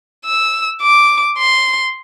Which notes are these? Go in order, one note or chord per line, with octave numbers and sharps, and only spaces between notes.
E6
D6
C6